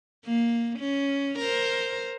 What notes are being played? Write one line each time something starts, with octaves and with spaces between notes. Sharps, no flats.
A#3
C#4
A#4 C5